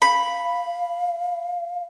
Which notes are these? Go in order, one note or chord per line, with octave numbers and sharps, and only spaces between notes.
F5 B5